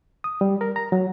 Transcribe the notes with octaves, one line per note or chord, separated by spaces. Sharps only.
D#6
G3
A#4
A#5
F#3